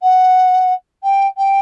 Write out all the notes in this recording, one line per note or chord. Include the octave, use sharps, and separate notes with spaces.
F#5
G5
G5